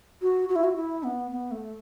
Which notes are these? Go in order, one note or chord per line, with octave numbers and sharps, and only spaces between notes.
F#4
F#4
E4
F#4
E4
B3
B3
A3